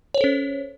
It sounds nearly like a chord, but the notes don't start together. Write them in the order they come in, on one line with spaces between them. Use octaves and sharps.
C#5 C5 A4 C#4